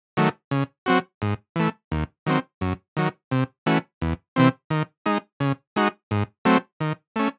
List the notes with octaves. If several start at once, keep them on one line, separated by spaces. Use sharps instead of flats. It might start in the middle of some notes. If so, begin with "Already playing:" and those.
D#3 F#3 A3
C#3
F#3 C4 F#4
G#2
E3 A3
D#2
D#3 F#3 C4
F#2
D#3 F#3
C3
E3 A3 C#4 F#4
E2
C3 E3 C4
D#3
G#3 D#4
C#3
G#3 D#4 F#4
G#2
F#3 A3 C4
D#3
A3 C#4